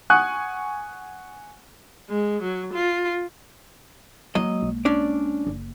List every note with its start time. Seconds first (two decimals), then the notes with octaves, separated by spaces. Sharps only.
0.10 F#5 G#5 C#6 D#6 F#6
2.09 G#3
2.42 F#3
2.74 F4
4.35 F#3 G#3 A#3 D#5
4.62 B1
4.85 C#4 D4 D5
5.47 F#1